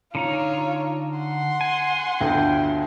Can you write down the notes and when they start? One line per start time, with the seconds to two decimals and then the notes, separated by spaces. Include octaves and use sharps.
0.15 D3 D#4 F4 C#5 A#5
1.19 F#5 C6
1.61 G#5
2.21 G1 D2 G5